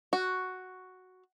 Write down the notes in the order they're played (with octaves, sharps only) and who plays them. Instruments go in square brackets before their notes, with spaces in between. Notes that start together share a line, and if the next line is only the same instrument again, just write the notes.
[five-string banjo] F#4